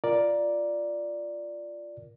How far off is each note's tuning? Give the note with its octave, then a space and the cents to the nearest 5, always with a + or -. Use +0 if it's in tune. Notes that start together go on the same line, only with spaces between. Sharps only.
F4 -10 A#4 +10 D5 +0